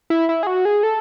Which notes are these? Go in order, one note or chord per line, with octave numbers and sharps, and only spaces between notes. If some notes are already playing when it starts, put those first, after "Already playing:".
E4
E4
G#4
F#4
G#4
A4